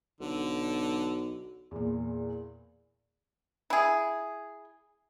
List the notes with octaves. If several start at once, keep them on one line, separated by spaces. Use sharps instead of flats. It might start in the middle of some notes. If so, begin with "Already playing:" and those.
B1 D3
E2 A#2
E4 G#4